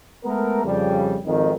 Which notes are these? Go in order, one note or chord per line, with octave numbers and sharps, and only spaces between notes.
G#3 A3 B3 A#4
F2 C#3 G3
G#1 F2 D#3